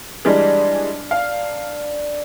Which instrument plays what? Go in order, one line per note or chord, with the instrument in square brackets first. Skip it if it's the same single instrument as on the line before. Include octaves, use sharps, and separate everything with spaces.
[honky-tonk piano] E3 G3 G#3 [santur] D4 A#4
[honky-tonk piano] F5